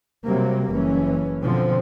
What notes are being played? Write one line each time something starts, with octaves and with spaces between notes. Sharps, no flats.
C3 F#3 G3 A#3 C4
F#1 E3 C#4
B2 D3 F3 C4